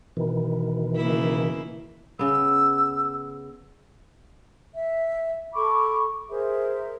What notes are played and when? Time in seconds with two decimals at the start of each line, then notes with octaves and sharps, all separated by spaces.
0.17 B2 D#3 E3
0.95 C#3 A#3 E4
2.19 C#3 B3 E6
4.75 E5
5.54 A4 B5 C#6 D6
6.29 G#4 A#4 C5 E5